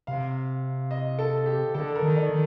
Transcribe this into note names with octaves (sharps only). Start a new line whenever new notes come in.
C3 F5
D#5
A4
G4
D3 A4
A#4
D#3
D5
D#3